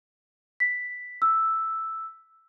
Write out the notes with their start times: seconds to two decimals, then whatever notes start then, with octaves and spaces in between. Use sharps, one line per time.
0.60 B6
1.22 E6